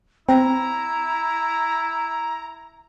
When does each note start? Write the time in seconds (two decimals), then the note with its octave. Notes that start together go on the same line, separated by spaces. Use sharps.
0.29 C4 E4 A#5